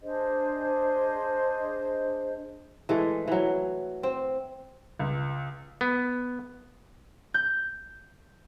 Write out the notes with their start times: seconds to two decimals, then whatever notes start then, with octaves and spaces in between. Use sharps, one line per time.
0.02 D4 G#4 C5 D#5
2.89 E3 G#3 A3
3.28 E3 F#3
4.03 C4
4.99 C#2
5.81 B3
7.34 G6